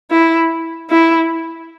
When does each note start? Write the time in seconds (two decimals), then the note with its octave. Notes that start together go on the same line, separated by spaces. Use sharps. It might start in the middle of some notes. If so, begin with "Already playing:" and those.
0.11 E4
0.90 E4